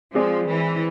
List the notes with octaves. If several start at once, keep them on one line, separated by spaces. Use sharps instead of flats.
F3 G#3 C4 G#4 D5
E3